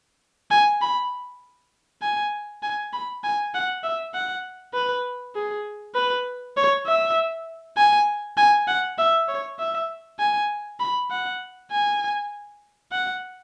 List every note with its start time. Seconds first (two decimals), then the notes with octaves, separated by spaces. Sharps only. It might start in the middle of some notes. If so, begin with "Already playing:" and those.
0.51 G#5
0.81 B5
2.02 G#5
2.63 G#5
2.93 B5
3.23 G#5
3.54 F#5
3.84 E5
4.14 F#5
4.74 B4
5.35 G#4
5.95 B4
6.57 C#5
6.86 E5
7.77 G#5
8.37 G#5
8.67 F#5
8.98 E5
9.28 C#5
9.59 E5
10.19 G#5
10.80 B5
11.11 F#5
11.71 G#5
12.92 F#5